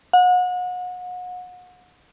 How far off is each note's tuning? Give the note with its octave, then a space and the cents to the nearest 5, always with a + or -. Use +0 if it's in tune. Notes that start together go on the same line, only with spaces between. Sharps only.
F#5 -35